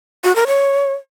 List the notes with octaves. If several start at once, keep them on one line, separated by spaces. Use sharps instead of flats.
F#4
A#4
C#5